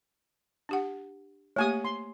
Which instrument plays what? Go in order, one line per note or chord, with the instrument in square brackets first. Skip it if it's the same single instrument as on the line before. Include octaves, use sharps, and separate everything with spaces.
[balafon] D4 G4 F#5
[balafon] A3 A#3 G4 [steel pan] C#5 G#5 D#6
[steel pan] C6